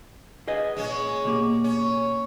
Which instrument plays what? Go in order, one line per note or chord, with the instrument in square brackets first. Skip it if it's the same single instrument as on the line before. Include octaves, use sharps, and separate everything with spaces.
[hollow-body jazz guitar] G#4 B4 D#5
[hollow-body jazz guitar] B1 A#2 [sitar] G#3 C#4
[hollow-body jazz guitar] B2 A#3 G4
[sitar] C#4